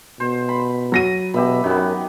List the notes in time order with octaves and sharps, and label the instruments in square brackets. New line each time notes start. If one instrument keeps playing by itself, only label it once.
[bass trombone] B2 [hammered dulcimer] C5
[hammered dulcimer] B5
[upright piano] F#3 A#6 D#7
[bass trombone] B2 [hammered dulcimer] G4 E5 B5
[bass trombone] F#2 [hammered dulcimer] D#3 B3